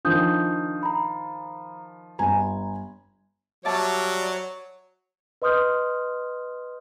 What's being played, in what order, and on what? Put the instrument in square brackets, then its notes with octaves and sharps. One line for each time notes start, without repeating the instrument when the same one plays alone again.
[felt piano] D#3 F3 [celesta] D4 D#6 G6
[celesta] A#5 B5
[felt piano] G1 G#5 [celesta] A#5
[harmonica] F#3 [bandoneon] G3 D5 D6 [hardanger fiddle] C#5 [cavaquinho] E5 A5
[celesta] B4 D#5 C6 D#6 F6 G6